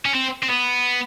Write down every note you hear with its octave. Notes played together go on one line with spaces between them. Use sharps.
C#4
C4
C4
B3